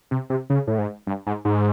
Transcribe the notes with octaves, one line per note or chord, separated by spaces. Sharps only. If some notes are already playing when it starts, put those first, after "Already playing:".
C3
C3
C#3
A2
G#2
G2
G#2
G#2